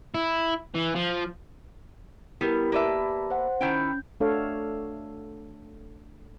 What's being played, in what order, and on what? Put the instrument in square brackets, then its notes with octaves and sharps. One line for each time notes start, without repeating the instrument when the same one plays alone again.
[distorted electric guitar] E4
E3
F3
[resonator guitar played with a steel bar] G3 B3 [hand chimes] E4 G4 A#4
[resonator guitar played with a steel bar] A#3 B4 E5 [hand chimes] G4 D5 A5
[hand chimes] C5 F#5
[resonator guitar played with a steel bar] D#3 E4 G5 [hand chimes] C#4 G6
[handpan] A3 D4 F#4 A4 C#5 F5